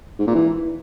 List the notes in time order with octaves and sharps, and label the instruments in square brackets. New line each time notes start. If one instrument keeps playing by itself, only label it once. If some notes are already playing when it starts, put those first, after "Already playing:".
[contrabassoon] G#2
A#2
E3